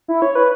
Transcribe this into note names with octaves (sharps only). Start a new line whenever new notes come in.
E4
C#5
B4